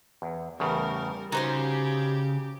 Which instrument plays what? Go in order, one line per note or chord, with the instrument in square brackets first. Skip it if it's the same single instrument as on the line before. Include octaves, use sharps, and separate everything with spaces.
[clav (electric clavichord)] E2
[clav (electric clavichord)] E2 A2 C#3 [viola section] G3 A#4
[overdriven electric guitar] C#3 [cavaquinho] D#4 C5 C6 [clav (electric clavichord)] F#4 [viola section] G4